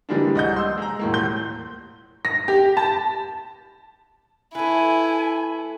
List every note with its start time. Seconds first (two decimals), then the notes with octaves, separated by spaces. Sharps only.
0.09 D3 E3 G3 G#3 A#3 D4
0.35 C2 D#5 F#5 G6
0.56 C6 E6
0.78 G#3 A#5
0.99 E1 A2 A#3
1.13 D#1 C6 G6 G7
2.25 A#6
2.48 G4
2.77 A5
4.55 A3 E4 B4 G#5